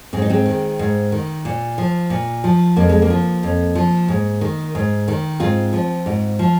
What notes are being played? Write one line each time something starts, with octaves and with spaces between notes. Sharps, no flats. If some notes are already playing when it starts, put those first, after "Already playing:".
G#2 C4
D#4
G#3 C4
D#3
G#2
D#3
A#2
F3
A#2
F3
F2 A#3
G#3
A#3
F3
F2
F3
G#2
D#3
G#2
D#3
G#2 C4 F4
F3
G#2
F3